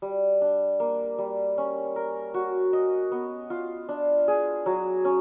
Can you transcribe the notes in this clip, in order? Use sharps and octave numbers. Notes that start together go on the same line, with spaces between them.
G3
D4
A#3
G3
C#4
A#4
F#4
D#5
B3
F4
D4
G#4
F#3
C#4